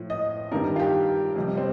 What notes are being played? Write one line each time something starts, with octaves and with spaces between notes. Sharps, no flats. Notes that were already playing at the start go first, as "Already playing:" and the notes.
Already playing: A2 F3
D#5
G2 D#3 G3 A#4
F4
G4
F2 C3 G3
C4